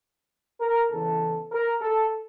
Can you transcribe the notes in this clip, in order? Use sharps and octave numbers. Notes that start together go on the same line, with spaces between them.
A#4
E2 C#3 E3 A4
A#4
A4